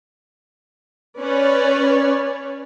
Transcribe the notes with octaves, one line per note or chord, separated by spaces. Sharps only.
C#4 B4 C#5 D5